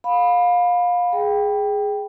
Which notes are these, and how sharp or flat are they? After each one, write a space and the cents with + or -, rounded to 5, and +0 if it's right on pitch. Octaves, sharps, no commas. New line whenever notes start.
F5 +25 B5 +0
G#4 +0 G5 +0